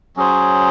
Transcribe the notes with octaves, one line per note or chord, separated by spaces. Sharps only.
F#3 C#4 G#4 C5